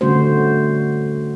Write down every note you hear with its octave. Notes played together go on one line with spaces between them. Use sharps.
D3 G3 A3 C#4 F#4 C5